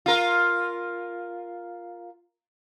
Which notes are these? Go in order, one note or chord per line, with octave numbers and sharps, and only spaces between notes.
F4 A#4